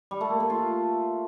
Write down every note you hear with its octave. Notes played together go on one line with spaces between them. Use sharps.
G3
A3
A#3
A3
F4